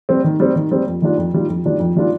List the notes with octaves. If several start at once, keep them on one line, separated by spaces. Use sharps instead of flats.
G3 C4
D#3
G3 C4
D#3
G3 C4
F2
D#3 G3 D4 F4
F2
D#3 G3 D4 F4
F2
D#3 G3 D4 F4
F2
D#3 G3 D4 F4